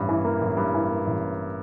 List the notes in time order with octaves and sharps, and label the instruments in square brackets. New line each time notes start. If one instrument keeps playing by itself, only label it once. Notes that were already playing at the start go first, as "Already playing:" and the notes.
Already playing: [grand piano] A1 G2
E3
A#3
A1
G2
E3
A#3
A1